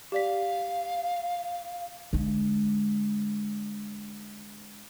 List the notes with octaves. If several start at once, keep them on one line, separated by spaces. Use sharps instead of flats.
G4 D5 F5 B6
D3 G#3